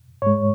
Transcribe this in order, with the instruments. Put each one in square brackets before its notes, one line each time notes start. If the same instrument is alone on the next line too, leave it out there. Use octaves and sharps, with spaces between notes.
[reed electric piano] G#2 G#3 C#5